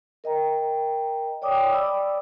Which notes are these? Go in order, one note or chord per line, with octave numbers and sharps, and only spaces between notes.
A#4 D#5 G5 A#5
C#5 D5 G5 D6 D#6
D5 B5 E6